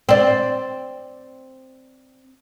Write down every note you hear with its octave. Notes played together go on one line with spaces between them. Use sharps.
C4 D5